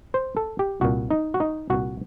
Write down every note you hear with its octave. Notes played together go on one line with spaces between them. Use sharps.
C5
A4
G4
C2 A#2 F#4
D#4
F#4
D#4
C2 A#2 F#4